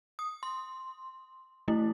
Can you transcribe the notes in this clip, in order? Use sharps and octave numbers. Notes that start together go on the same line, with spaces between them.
D#6
C6
E3 A3 E4